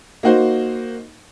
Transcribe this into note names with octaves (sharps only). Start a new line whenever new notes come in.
A#3 D#4 F#4 C5